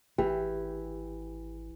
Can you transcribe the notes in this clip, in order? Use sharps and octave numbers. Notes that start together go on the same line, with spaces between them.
G#1 E3 G4